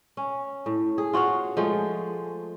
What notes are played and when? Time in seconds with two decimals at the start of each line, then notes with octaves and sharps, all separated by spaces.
0.17 C#4
0.66 A2
0.98 G#4
1.13 F4 F#4 C#5 F5
1.57 F3 G#3 A3